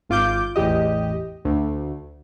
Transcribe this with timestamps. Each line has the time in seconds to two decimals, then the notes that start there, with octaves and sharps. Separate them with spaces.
0.09 G#1 F4 D6 G6
0.56 A1 E2 G4 D#5
1.45 D2